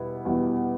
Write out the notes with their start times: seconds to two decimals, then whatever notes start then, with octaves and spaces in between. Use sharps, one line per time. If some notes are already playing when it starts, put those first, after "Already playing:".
Already playing: E2 B2 G3 B3 E4
0.25 E2 B2 G3 B3 E4